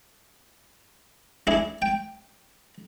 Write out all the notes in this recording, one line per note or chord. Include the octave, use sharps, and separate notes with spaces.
D4 E4 G#4
G5